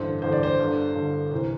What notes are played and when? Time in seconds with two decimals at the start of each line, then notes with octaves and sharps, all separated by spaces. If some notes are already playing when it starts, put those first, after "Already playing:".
Already playing: A1 G2 D3 C5
0.22 A1 G2 D3 C5
0.33 D5
0.43 C5
0.59 G1 G2 D3
0.95 G1 G2 D3
1.31 C2 C3 E3 C5